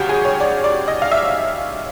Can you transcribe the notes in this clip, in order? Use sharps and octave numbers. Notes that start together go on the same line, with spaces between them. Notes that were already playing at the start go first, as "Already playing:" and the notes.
Already playing: G1 F#2 C#3 F#4 G4
G#4
C#5
D5
D5
D#5
F5
E5